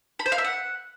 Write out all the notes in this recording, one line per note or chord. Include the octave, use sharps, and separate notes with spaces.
B5
C5
F5
E5
F#5